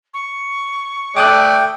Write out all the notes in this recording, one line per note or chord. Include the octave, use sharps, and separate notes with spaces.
C#6
A3 D5 G5 D6 D#6 F#6